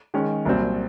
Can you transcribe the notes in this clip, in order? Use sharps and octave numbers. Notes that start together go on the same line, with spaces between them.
D#3 G#3 C#4
C2 A#2 F#3 C4